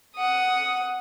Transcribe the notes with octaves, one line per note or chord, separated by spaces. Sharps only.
F#5 D#6